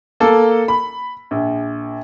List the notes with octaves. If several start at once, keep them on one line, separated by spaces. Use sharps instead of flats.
A#3 A4
B5
A#1